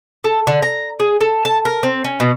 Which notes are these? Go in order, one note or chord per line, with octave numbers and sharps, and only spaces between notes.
A4
D3
A#5
G#4
A4
A5
A#4
C4
C#4
B2